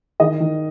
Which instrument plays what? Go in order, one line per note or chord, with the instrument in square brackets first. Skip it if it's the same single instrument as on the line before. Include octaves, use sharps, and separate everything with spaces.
[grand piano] D#3 [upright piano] D#5
[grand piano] D#3